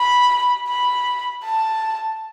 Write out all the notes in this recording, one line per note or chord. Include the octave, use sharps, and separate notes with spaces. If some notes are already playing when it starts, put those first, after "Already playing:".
Already playing: B5
B5
A5